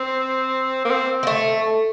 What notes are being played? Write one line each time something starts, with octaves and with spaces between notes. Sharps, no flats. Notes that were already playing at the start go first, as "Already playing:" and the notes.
Already playing: C4
A#3
C4
A#3
A3